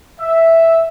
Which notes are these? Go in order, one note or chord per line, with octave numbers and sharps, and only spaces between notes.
E5